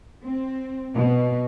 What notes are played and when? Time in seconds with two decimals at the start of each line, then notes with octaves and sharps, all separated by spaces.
0.23 C4
0.96 B2